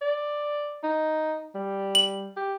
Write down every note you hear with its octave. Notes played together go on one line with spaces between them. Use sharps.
D5
D#4
G3
F#7
G4